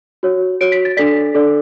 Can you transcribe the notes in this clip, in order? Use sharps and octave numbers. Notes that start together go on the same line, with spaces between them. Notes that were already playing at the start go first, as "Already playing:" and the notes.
F#4 C#5
F#4 C#5 D7
B6
A6
D4 A4 D5 B6
D4 A4 D5